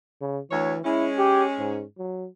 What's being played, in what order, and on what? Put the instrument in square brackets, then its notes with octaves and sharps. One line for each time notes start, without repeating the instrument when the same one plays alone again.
[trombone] C#3
[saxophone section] D2 C#5 [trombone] E3
[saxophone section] G#3 C#4 [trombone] E4
[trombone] G4
G#2
F#3